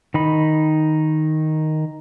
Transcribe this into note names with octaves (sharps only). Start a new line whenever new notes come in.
D#3 D#4 B5